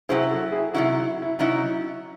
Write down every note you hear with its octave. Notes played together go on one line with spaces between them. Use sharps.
C3 F#3 C#4 E4 G#4 C5
F#4 A4
E4 G#4
C3 F#3 C#4 D#4 E4 F#4
E4
E4
C3 F#3 C#4 D#4 E4